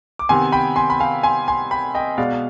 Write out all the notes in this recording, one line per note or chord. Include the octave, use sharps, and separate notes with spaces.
D6
C3 D#3 B3 G#5 C6
G5 B5
G#5 C6
B5
F5 G#5
G#5 C6
G#5 C6
G5 B5
D#5 G5
B2 G#3 B3 D5 F5